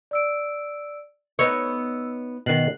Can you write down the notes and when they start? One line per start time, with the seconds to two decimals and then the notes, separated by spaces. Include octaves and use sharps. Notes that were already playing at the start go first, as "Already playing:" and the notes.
0.11 D5 E6 D7
1.39 B3 D#4 C#5 E6
2.46 B2 D#3 F#6 C7 F#7